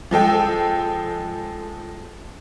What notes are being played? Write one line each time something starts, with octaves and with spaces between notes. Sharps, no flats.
F3 G#3 A4 G5